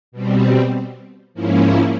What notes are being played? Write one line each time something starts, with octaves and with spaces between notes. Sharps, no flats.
B2 G3 C4
G#2 F3 A#3 C#4 E4